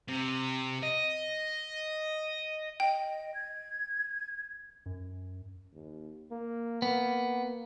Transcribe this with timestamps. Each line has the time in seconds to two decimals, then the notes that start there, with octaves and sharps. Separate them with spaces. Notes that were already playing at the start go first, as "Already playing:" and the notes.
0.08 C3
0.83 D#5
2.80 D#5 G5
3.34 G#6
4.86 F#2
5.73 D#2
6.31 A#3
6.82 A#3 B3